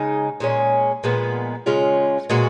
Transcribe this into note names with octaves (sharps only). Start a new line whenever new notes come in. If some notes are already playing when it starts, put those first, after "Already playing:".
Already playing: C#3 G#3 D#4
A#2 G#3 C#4
A#2 F3 G#3 B3
C#3 G#3 C#4 F4
A#2 G#3 B3 F#4